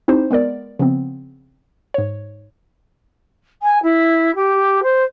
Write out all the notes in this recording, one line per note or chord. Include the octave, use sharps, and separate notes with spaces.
C4 D#4 E4 G4 C5
G#3 B3 A#4 D5
C#3 F3 B3 C4
G#2 C#5
G#5
E4
G4
C5